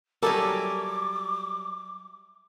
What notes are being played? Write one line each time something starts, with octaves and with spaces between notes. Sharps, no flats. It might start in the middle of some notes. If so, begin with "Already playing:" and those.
F#3 G3 A4 A#4 E5 G#5 D6